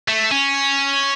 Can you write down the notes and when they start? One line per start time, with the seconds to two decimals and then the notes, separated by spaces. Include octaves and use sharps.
0.08 A3
0.31 C#4